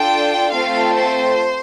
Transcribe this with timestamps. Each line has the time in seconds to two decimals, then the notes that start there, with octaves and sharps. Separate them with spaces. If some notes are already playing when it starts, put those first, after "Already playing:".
Already playing: D4 F4 A4 G5
0.52 A3 C4 F4 A4 F5
0.93 C5